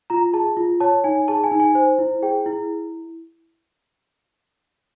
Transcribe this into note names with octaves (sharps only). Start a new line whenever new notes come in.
F4 A#5
G#4 A5
F4
C#5 A5
D#4 G#5
G#4 A5
G#5
D#4
G#5
C5
E4
G#4 G5
E4